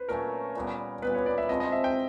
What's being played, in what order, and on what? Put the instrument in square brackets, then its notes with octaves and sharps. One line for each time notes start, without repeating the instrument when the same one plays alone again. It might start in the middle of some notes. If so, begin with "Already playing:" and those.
Already playing: [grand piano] B4 C5
[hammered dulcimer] A#2 F#3 A3 C#4 [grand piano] A#4
[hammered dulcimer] A#2 G3 B3
[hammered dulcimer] A#2 G3 B3 [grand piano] B4
[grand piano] C#5
D5
E5
[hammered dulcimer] C3 F3 G#3 C4 [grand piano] D#5
[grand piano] D#5
E5
G5